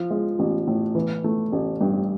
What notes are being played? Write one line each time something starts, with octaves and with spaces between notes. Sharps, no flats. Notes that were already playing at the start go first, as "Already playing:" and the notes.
Already playing: F3
G#3
A1
A2
E3
A3
A1
G2